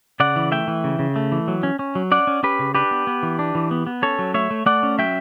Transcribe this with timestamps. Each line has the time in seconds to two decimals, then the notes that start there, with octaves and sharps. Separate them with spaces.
0.20 C#3 D5 F#5
0.36 E3
0.51 A3 E5 G5
0.68 E3
0.84 C#3
0.99 C#3
1.16 A3
1.32 E3
1.48 F#3
1.63 C#4
1.79 C#4
1.95 F#3
2.11 C#4 D5 F#5
2.27 C#4
2.43 C#4 G4 B4
2.59 C#3
2.75 D4 G4 B4
2.91 B3
3.07 B3
3.23 E3
3.39 D4
3.55 E3
3.71 B3
3.87 B3
4.02 C#4 A4 C#5
4.19 F#3
4.34 A3 C#5 E5
4.51 A3
4.66 A3 D5 F#5
4.83 C#4
4.98 F#3 E5 G5